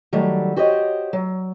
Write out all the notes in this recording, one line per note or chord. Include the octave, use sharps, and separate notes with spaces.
D#3 F#3 G3 A3
F#4 G4 C5 C#5 D#5
F#3